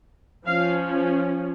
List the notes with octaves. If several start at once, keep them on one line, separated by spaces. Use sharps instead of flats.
F3 C#4 F5